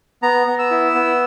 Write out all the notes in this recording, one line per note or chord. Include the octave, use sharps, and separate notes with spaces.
B3 A#5
B3
E6
E4
B3